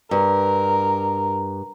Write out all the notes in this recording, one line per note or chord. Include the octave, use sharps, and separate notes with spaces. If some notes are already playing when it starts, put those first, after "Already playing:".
G2 A#4